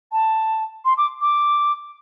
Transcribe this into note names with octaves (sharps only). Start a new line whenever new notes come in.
A5
C6
D6
D6